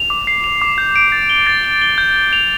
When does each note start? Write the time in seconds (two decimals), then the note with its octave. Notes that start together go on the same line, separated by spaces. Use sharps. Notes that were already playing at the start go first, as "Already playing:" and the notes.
Already playing: F7
0.10 D6
0.27 C7
0.44 F7
0.62 D6
0.78 G6
0.96 D7
1.12 A6
1.29 G7
1.47 A6
1.65 G7
1.82 G7
1.98 G6
2.16 G6
2.33 F7